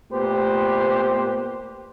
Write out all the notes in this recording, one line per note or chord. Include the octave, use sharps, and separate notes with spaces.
A#2 A3 B3 G4 B4 C5